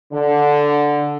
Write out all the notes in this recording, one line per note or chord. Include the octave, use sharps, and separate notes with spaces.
D3